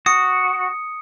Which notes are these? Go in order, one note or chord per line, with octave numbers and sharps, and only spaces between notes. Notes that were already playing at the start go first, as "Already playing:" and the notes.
F#4 D#6 C#7